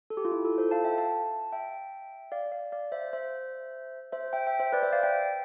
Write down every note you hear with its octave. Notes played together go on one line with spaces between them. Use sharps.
A4
G4
F4
E4
F4 A4
A4 C5
F5 A5
E5 G5
F5 A5
E5 G5
D5 F5
D5 F5
D5 F5
C5 E5
C5 E5
C5 E5
E5 G5
E5 G5
C5 E5
B4 D5
C5 E5
D5 F5
E5 G5